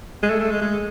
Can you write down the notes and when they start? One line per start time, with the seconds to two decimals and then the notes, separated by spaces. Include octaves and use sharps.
0.23 G#3
0.30 A3
0.40 A3
0.51 G#3
0.62 G#3